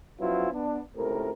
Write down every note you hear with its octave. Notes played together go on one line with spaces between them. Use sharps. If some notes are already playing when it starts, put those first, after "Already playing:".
F3 F#3 B3 C#4 E4 F4
B3 D4
C#2 A2 C3 A#4